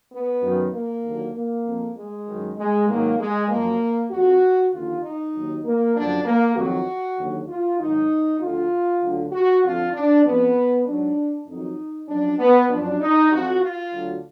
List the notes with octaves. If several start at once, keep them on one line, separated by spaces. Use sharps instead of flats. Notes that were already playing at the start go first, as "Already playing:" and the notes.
B3
F#2 D#3 F#3
A#3
D#2 D3 F#3
A#3
F2 F3
G#3
F#2 D#3 F#3
G#3
G#2 D#3 F#3 A#3
G#3
F3 A#3
F#2
F2 F3 F#4
D#2 D3 F3 F4
D#4
D#2 D#3 F#3
A#3
F#2 D3 F3 D4
A#3
F2 D#3 F#3 F#4
D#2 D3 F#3
F4
G#2 D#3 F#3 D#4
D2 D3 F3 F4
D2 D3 F#3
F#4
F2 D3 F3 F4
D4
F2 F3 B3
G#2 F#3 D4
F2 D#3 F#3 D#4
F#2 F3 D4
B3
F3 D4
F#2
D#4
F2 F3 F#4
F4
D2 D3 F#3